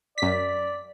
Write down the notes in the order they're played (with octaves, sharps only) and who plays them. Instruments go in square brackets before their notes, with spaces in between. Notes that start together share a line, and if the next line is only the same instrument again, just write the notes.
[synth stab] F#2 B6 [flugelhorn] D5